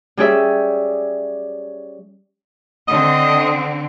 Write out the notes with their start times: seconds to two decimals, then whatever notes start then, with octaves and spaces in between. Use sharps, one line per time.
0.17 G3 C#4 G4 G#4 E5
2.88 D3 C4 D#5